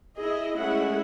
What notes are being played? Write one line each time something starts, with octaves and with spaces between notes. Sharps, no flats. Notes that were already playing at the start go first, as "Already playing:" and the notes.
E4 G#4 D#5
G#3 A3 C#4 E4 F#5